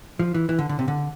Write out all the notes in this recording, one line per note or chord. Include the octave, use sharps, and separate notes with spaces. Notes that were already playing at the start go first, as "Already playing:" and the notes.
F3
E3
E3
D3
D3
C3
D3